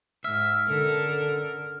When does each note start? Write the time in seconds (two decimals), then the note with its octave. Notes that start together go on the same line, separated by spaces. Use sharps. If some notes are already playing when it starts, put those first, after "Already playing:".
0.24 G#2 E5 F6
0.68 D3 C#4 A4 A#4